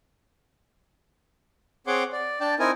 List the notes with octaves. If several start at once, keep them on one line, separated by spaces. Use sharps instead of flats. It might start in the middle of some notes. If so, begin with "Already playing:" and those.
C4 G#4 C#5 F#5 C6 D6
D5
D4 D5 G5 A5
C4 D#4 E4 A#4 G#5